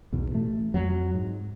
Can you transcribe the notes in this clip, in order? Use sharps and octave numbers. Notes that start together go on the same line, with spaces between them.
B1 E2 B2
A1 A3
F2 F#3
G#2